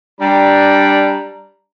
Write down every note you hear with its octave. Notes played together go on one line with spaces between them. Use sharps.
G3 D4 A#5